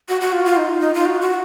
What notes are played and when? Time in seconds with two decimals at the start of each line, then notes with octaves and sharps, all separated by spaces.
0.09 F#4
0.21 F#4
0.32 F4
0.45 F4
0.57 D#4
0.69 F4
0.81 D#4
0.94 F4
1.05 F#4
1.21 F#4